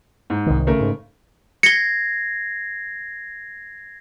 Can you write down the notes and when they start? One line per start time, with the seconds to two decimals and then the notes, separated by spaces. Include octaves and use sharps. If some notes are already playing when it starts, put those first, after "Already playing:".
0.30 G#2
0.46 C2 D#3
0.67 C#3 A3 A#4
0.81 G#2
1.63 G#6 A#6 C7 C#7 G7